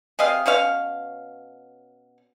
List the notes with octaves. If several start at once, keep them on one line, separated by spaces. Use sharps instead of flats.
C3 G#4 D#5 F5
B2 C#4 C#5 F5